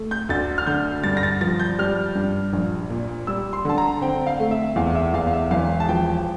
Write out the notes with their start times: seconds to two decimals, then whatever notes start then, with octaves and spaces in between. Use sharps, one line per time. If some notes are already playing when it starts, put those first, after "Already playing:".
Already playing: A3
0.11 G6
0.29 D2 A6
0.58 F6
0.67 D3 G6
1.03 G2 A6
1.17 A#6
1.23 A6
1.41 F3 A6
1.60 G6
1.79 G3 F6
2.15 G2
2.53 A#1
2.90 A#2
3.27 G3 E6
3.53 C6
3.65 D3 A5
3.78 A#5
4.02 C4 G5
4.27 F5
4.40 A3
4.51 E5
4.76 E2 F5
4.95 E5
5.14 E2 F5
5.27 F5
5.33 E5
5.51 E1 F5
5.80 A5
5.89 F3 G5